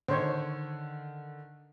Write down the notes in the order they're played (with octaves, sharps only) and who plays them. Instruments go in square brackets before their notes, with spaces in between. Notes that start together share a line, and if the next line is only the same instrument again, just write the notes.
[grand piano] D3 D#3 [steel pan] C5 C#5